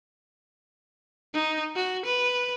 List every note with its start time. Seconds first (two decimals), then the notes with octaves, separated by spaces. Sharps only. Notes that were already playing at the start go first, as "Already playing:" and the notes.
1.34 D#4
1.76 F#4
2.05 B4